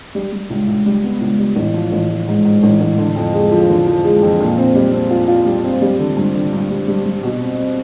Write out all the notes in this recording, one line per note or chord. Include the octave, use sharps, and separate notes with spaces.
G3
G3
C#2
C#2
G3
B3
C#2
G3
A1
F3
A1
F3
G#2
G#2
A1
A1
D3
F2
G#3
F3
D3
F3
G#3
F2
A#2
C4
G3
C4
F4
F4
G3
C4
G3
D3
G2
D3
G2
G3
G3
G3
B2
C4
C4